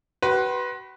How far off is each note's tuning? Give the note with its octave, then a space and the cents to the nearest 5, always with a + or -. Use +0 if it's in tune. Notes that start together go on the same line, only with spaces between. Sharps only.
F#4 +40 B4 +0 C6 +20